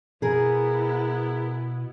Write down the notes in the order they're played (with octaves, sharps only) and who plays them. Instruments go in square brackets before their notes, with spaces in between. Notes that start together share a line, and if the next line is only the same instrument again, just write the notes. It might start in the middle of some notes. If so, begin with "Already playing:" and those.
[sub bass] B2 [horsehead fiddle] B3 E4 [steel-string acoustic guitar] G#4 A#4